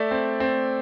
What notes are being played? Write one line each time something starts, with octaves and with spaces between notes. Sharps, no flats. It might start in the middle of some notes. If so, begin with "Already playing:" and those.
Already playing: A3 D5 E5
C4
C4